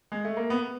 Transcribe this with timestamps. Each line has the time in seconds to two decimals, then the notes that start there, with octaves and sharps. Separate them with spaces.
0.12 G#3
0.25 A3
0.37 A#3
0.50 B3